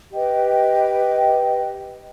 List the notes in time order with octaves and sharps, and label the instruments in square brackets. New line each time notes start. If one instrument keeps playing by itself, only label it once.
[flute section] G4 B4 D#5 G5